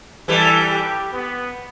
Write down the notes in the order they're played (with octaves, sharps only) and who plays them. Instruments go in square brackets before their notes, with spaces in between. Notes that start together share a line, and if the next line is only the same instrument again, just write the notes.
[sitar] E3 G3 [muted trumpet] A4
[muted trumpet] G4
B3